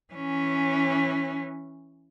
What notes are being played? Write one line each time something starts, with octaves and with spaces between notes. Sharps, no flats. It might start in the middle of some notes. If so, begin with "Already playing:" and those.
E3 C#4